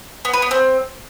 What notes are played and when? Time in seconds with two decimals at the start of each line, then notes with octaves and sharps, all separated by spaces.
0.25 B3
0.33 B4
0.42 B3
0.51 C4